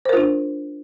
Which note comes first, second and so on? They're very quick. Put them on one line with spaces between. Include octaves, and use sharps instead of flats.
C5 A#4 F4 D4